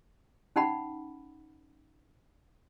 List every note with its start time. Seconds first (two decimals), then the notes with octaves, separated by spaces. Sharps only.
0.56 C#4 D#4 F#5 B5